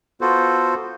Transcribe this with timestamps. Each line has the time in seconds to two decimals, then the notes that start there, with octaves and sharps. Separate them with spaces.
0.21 B3 F4 F#4 A4 C5